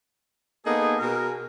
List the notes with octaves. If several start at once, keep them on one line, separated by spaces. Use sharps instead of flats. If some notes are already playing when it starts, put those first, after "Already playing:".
A#3 B3 D#4 G#4 A4
B2 G#4 A#4